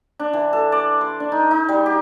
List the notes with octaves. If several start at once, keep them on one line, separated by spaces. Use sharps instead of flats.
D4
E3
A4
D5
C6
D4
D#4
D#4
G3
G4